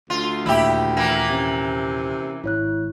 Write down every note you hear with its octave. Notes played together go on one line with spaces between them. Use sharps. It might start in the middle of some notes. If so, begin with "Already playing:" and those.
D2 F4
D#2 A#2 E4 G4 E5 B5 E6
E3 A#3
C3 C4 C#4
G#1 E4 C#5 F#6